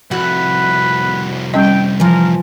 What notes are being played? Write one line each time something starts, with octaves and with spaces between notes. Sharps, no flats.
C2 F2 E4 F#4 B4 F#5
G3 C#4 D#5 G5
E3 F3 A#4